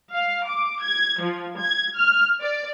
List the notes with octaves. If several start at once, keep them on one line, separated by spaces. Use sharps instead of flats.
F5
D6
G#6
F3
G#6
F6
D5